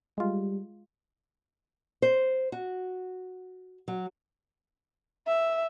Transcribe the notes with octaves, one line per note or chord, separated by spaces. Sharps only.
G3 G#3 F4
C5
F#4
F#3
E5